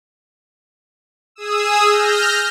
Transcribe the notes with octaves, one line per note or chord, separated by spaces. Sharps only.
G#4 D#6 E6
F6 G6 A#6